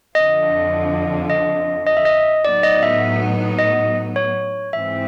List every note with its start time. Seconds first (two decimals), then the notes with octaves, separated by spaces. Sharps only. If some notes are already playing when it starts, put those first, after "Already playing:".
0.15 F2 D3 F3 D#5
1.30 D#5
1.87 D#5
1.97 E5
2.05 D#5
2.44 A2 F#3 B3 D#4 D5
2.63 D#5
2.83 E5
3.59 D#5
4.16 C#5
4.73 G#2 E3 G#3 C4 E5